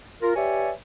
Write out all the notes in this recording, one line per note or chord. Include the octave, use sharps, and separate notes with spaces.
F4 A#4
G4 B4 C#5 D5 E5 G#5